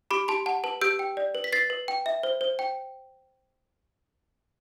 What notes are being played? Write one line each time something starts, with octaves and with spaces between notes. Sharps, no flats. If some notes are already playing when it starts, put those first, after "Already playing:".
G4 B5 D6
G4 A5 C6
F#5 A5
B4 A5
G4 E6 G6
G5
D5
B4
B6
B4 A6 C7
B4
G5
E5
C5
C5
G5